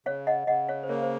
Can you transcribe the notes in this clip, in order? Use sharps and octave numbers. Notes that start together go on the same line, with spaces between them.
C#3 C#5 F5
D#5 F#5
C#3 D#5 F#5
C#5 F5
C5
A#3 A#4 C#5
C5